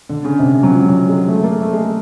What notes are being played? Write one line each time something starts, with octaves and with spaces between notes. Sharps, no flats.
D3
C#3
C3
C#3
F#3
F3
F#3
G#3
A3
A#3
A3
G#3